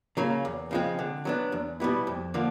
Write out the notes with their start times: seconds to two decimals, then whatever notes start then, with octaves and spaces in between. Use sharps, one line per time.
0.17 C#3 F#3 A#3
0.45 E2
0.71 C#3 F3 G#3 C4
0.99 D3
1.25 F#3 B3 D4
1.52 E2
1.80 B2 G3 B3 E4
2.07 F2
2.34 D3 F3 A#3